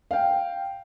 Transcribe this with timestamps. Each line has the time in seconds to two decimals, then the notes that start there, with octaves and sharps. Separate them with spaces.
0.11 F5 G5